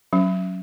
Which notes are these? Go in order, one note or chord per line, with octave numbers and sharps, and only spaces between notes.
F#3 C#4